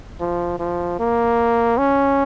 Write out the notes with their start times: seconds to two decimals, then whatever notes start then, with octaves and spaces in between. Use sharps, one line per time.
0.20 F3
0.59 F3
0.99 A#3
1.78 C#4